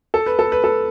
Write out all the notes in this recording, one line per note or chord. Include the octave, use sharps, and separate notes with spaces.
A4
B4
A4
B4
A4